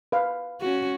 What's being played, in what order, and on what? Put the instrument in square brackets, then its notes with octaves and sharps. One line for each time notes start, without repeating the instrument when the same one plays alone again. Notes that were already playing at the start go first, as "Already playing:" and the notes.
[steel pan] B4 F5
[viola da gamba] C#4 F#4